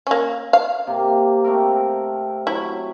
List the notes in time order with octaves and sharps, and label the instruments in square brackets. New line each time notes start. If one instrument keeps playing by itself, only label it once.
[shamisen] A#3 C#4
F5
[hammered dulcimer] C3 A#3
A3 C4 A#4
[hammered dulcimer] F#3 [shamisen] E4